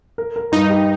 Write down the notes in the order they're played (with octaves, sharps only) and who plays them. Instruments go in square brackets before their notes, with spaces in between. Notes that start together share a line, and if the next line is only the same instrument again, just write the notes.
[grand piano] A#4
A#4
[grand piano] G2 [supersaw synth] D#4
[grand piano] G4